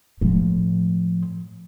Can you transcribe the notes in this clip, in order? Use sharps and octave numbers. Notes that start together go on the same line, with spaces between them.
A2 F3